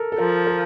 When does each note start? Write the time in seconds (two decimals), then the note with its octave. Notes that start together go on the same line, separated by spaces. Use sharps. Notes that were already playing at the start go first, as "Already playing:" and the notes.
Already playing: A4 A#4
0.12 A4
0.18 F3 A#4
0.47 A#4